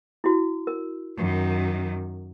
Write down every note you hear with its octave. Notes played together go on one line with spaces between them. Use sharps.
E4 F#4
A#4
F#2 D#3